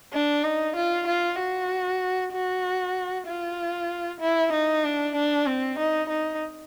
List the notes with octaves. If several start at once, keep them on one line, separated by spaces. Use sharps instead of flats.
D4
D#4
F4
F4
F#4
F#4
F4
E4
D#4
D4
D4
C4
D#4
D#4